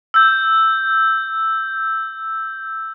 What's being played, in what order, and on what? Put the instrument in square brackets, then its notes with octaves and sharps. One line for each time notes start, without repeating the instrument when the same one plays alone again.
[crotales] E6 G6